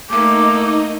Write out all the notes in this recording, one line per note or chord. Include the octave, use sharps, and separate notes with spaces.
A3 A#3 D#4 D6